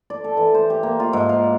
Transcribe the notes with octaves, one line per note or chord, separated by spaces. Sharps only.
D5
A4
E3
C5
G4
A#3
F4
G#2
F5
D5